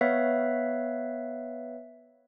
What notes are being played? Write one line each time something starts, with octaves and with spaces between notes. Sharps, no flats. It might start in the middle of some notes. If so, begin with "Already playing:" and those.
B3 B4 C#5 E5 F5